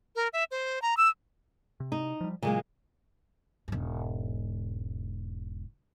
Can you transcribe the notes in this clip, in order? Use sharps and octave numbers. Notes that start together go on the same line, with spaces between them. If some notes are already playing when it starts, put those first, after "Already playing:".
A#4
E5
C5
A#5
E6
C3
D#4
F3 G3
A#2 C#3 F#3 G#3 A#3
E1 G#2